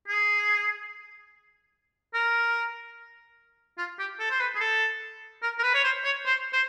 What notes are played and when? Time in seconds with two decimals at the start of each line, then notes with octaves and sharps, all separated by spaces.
0.08 G#4
2.14 A#4
3.78 F4
3.99 G4
4.19 A4
4.30 C5
4.40 B4
4.55 G#4
4.60 A4
5.42 A#4
5.59 A#4
5.63 B4
5.74 C#5
5.84 C5
6.04 C#5
6.25 C5
6.53 C5